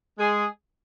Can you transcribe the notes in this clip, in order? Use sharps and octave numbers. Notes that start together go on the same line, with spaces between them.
G#3 G#4